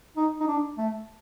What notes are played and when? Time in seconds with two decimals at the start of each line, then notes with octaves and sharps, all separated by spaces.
0.17 D#4
0.40 D#4
0.47 D4
0.78 A3